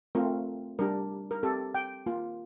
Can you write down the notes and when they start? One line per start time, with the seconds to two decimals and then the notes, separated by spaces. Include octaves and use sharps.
0.15 A3 C4 F4 A#4
0.79 G3 D4 G4 A#4
1.31 A#4
1.43 C4 G4 A4
1.75 G5
2.06 A#3 F4